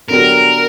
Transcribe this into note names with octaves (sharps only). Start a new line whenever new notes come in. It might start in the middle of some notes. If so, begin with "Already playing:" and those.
D3 F#3 B3 D4 G4 A#4